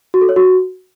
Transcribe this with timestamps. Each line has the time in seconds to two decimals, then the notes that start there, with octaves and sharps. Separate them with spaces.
0.14 F#4
0.21 A4
0.29 C#5
0.36 F#4